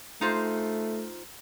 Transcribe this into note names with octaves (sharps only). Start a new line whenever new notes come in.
A3 D#4 F4 C5